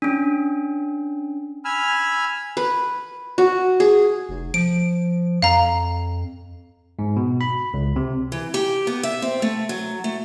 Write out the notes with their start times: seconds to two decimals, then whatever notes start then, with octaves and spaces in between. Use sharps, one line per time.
0.02 C#4 D4
1.65 G#5 B5 E6 F6
2.57 B4
3.38 F#4
3.80 G#4
4.29 F1
4.54 F3 D7
5.42 F2 F5 A#5
6.99 G#2
7.16 B2
7.41 B5
7.74 C#2
7.96 C3
8.32 E3
8.54 G4
8.87 B3
9.03 E5
9.22 C4
9.42 A3
9.69 F#3
10.04 A3